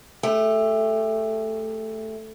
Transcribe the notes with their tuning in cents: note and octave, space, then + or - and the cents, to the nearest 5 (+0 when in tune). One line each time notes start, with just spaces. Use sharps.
A3 +0 G4 +35